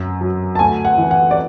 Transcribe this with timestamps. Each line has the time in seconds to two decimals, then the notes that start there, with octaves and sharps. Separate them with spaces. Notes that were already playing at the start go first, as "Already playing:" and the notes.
Already playing: F#2
0.21 F#3
0.55 A5
0.59 D2 G#5
0.85 F#5
0.98 E3
1.11 F#5
1.31 D5